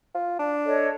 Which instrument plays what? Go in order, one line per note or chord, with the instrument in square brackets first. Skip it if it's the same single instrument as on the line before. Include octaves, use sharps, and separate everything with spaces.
[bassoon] F4
D4
[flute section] A4 C#5 D#5